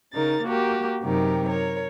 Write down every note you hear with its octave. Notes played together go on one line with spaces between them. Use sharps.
C#3 D#4 A#4 A6
A#3 F#4 G4 A#4
F#2 C3 F#3 D#4 G4 A#4
A#4 C#5